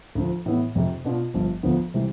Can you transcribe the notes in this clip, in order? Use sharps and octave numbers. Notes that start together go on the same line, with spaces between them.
D2 D3 F3
A2 E3 B3 E4
F1 F2 C3
B2 B3 D4 F4
G1 G2 F3
D2 D3 F3 B3
C3 E3 G3